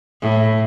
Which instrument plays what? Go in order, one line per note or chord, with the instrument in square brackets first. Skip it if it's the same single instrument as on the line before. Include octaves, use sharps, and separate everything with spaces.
[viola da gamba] A2